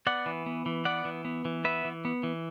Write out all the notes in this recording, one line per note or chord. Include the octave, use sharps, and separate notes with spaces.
B3 D5 F#5
E3
B3
E3
B3 D5 F#5
E3
B3
E3
B3 B4 E5
E3
B3
E3